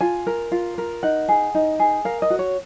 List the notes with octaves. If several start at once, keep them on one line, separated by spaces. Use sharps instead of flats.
F4 G#5
A#4
F4
A#4
D#4 F#5
G#4
D#4
G#4
A#4 F5
D#5
F#4
C#5